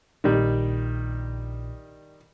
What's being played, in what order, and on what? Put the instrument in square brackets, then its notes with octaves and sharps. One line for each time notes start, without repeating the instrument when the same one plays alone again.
[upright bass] A#1 [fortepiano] D#3 G3